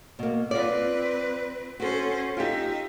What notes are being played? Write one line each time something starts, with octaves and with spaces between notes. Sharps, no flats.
B2 A#3
C4 F4 B4 D5
C#4 F#4 A4 C5
D#4 F4 G4 E5